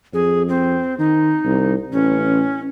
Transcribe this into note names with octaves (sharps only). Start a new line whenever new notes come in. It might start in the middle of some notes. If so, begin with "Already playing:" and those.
F2 G#4
C4
D#3 D#4
C2
A1 C#4